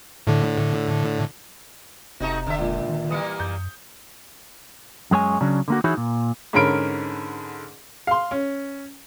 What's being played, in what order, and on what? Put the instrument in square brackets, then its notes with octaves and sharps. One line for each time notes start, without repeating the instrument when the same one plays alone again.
[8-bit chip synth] A2 D3
[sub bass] F1 [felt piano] C3 E7 [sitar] A3 D#4 F#4
[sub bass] F1 [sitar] D3 E5
[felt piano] C#2 A#2
[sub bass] D#3
[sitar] E3 G3 A#3 [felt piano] D#6 C#7
[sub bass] F#2 [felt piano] G6
[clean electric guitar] F#2 G#3 C#5 G#5
C#3 F#3 C#4 D4
D3 A#3 F#4
E3 D#4 E4 F#4 G#4 C#5
A#2
[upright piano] G#2 D3 C#4 A#4 B5 D7
F5 C6
C#4